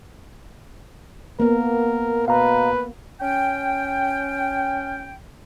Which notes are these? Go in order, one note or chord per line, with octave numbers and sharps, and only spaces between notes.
A#3 B3 A#4
B2 B4 F5 A#5
C#4 G5